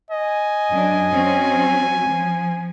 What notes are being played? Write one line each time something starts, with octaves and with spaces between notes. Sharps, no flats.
D#5 G#5
F#2 D4
F#3 C4 C#4
F3